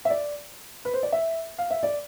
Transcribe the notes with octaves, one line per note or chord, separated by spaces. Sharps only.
E5
D5
B4
C5
D5
E5
F5
E5
D5